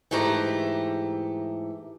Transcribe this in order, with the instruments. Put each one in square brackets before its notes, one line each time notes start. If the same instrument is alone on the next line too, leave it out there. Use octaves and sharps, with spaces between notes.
[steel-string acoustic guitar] G#2 E3 A3 G4 A#5